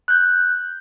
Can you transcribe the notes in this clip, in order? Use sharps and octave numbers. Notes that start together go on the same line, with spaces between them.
F#6 G6